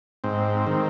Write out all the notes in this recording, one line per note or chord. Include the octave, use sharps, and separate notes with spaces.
G#2 C4
D#3